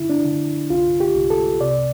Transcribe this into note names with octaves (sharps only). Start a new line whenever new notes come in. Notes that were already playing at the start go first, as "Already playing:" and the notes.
Already playing: D3 E4
D4
D3
C2 F4
G4
C2
A4
C3 D5